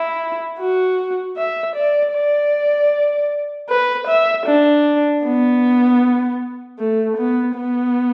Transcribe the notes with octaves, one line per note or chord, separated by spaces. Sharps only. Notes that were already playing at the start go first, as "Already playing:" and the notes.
Already playing: E4
F#4
E5
D5
D5
B4
E5
D4
B3
A3
B3
B3